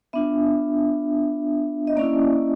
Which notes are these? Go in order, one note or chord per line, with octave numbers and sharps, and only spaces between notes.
B3 D4 F4 E5
D#5
A#3 C#4 E4 D5